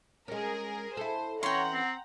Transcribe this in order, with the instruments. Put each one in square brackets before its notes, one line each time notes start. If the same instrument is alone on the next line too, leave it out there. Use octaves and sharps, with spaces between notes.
[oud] G#3 C#4 [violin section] G#4 A#4
[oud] E4 A4 [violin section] C5
[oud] E3 C#4 [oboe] C#5 [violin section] F#5 A#5 [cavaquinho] G5 C6
[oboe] C4